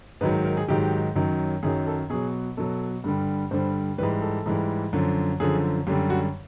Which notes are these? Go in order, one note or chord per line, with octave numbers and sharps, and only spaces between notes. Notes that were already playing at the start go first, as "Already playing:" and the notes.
G#2 D#3 F#3 B4
A#4
A#4
G#4
G#2 D#3 F#3 G4
F#2 D#3 F#3
F#2 D#3 F#3 G#4
A4
B2 F#3 G#4
B2 F#3 A4
G2 D3 G3
G2 D3 G3 C5
G#2 E3 G3 B4
A4
G#2 E3 G3
F#2 D3 F3
F#2 D3 F3 G#4
F#2 D3 G3 G4
F#4